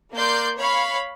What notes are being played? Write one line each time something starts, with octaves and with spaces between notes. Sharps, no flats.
A#3 A#4 D5 C6 G6
C#5 F5 B5